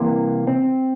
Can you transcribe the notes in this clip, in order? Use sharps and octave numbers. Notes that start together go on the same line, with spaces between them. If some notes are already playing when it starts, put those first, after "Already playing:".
Already playing: C2 C3 E3 A#3
C4